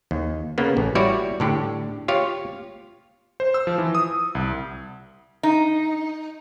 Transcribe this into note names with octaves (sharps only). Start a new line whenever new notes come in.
D#2
C#3 A#3 B3
A1
G3 E4 F#4 C#5 D5
A2 D3 G4
F4 G4 C#5 F5
C5
E6
F3
E3
D#6
C2
D#4